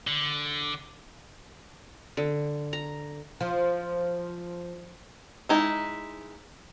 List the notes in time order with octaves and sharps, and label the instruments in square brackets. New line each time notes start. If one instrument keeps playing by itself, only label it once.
[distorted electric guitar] D3
[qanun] D3
A#5
[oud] F3
[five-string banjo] G#3 D#4 E4